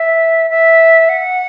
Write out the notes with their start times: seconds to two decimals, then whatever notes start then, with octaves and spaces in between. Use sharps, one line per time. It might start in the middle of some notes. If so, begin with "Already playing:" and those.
Already playing: E5
0.50 E5
1.09 F#5